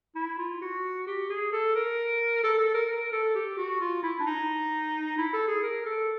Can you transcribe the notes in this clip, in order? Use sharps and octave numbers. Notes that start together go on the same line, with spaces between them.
E4
F4
F#4
G4
G#4
A4
A#4
A4
A4
A#4
A#4
A4
G4
F#4
F4
E4
D4
D#4
E4
A4
G#4
A#4
A4